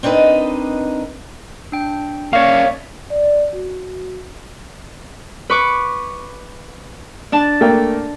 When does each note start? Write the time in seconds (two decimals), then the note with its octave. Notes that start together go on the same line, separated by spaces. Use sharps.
0.03 C4 D4 D#4 A#4 B4 D#5
1.72 D4 G5
2.33 A#3 C#4 C#5 D5 E5 F5 C#6
3.10 D5
3.53 F#4
5.50 B4 C#6 D6
7.32 D4 A5
7.61 A3 A#3 G5